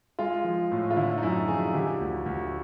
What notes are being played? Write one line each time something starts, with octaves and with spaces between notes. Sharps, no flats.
G#3 F4
F3
A2
F4
D3 E4
D#4
F#2 E4
F3 G#4
D3 G4
D2
D2